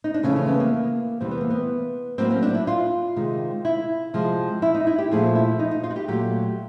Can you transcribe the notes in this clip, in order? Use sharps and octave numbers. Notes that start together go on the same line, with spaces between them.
D#4
D4
F2 C#3 E3 A3 C#4
C#4
B3
A#3
E2 C3 E3 G3 C4
B3
A#3
B3
A2 F#3 A#3 C4
C#4
D4
E4
F4
C3 D#3 G#3
E4
C3 F3 G#3
E4
D#4
E4
G4
A#2 F3 A3 G#4
E4
D#4
D#4
F4
F#4
G4
A#2 F#3 A3 G4